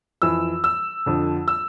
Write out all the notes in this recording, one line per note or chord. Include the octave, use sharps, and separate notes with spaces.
F2 E3 E6
E6
F2 D3 F3
E6